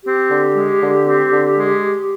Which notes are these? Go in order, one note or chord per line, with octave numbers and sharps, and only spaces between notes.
C4 G4
D3
G#3
D3
C4
D3
G#3